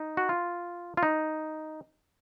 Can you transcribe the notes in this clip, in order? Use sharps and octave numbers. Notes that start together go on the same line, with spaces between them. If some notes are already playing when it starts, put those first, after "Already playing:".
Already playing: D#4
F#4
F4
F4
D#4